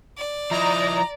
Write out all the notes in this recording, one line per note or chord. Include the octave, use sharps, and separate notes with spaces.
D5
F3 E4 D#5 A#5